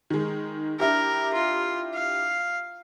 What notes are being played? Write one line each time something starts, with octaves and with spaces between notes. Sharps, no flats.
D#3 G#3
D4 E4 G4 A#4
F4
F5